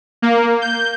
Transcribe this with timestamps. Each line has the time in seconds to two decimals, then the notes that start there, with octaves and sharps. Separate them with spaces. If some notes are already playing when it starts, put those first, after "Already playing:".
0.22 A#3
0.62 G6